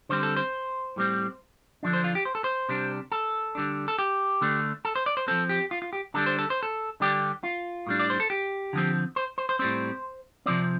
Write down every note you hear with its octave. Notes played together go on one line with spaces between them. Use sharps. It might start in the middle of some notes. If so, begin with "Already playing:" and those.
D3 G3 C4 C5
A4
C5
A2 G3 C4
D3 F3 D4
C5
F4
G4
C5
A4
C5
C3 G3 D4
A4
D3 G3 D4
A4
G4
D3 A3 D4
A4
C5
D5
C5
F3 C4 A4
G4
F4
F4
G4
D3 G3 D4 A4
C5
A4
C5
A4
D3 G3 D4 G4
F4
A2 G3 D4
D5
C5
A4
G4
D3 F3 C4
C5
C5
C5
A2 G3 C4 C5
C3 F3 C4 D5